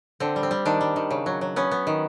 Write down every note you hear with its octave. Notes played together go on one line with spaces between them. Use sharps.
D3 C4
G3
C4
G3
D#3 D4
G3
D#3
C#3
F#3
F#3
B3 C#4
B3
D#3